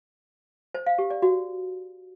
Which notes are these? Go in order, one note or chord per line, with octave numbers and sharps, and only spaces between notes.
C5
F5
G4
D5
F#4